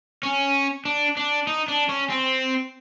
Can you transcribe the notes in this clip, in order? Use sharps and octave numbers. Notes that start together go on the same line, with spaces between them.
C#4
D4
D4
D#4
D4
C#4
C4